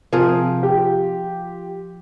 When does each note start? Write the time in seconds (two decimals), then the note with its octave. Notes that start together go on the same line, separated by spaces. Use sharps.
0.13 C3 F3 G#4 A#4
0.63 F4 G4